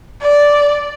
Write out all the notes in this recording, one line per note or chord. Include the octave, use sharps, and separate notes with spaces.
D5